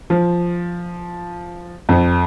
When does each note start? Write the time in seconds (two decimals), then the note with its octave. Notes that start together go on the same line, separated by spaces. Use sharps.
0.10 F3
1.89 F2